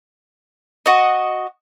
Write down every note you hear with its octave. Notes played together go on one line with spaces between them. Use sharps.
F#4 D#5